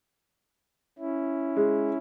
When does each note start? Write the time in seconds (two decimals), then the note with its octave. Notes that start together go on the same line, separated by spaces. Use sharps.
0.98 C#4 E4
1.57 G#3